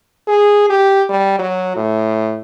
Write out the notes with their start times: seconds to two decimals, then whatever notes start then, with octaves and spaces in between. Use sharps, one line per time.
0.28 G#4
0.70 G4
1.09 G3
1.39 F#3
1.76 A2